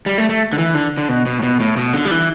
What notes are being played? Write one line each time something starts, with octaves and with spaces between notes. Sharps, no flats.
G3
A3
A3
D3
E3
D3
D3
B2
B2
A2
B2
A2
B2
D3
G3
E3